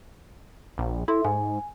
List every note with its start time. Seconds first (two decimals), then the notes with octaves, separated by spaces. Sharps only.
0.78 A#1
1.08 E4 A4 E5 C6
1.25 G#2 G#5